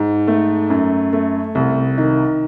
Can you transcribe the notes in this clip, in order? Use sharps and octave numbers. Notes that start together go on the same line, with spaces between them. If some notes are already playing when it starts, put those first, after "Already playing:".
Already playing: G#2
A3
F#2
A3
C2
D#3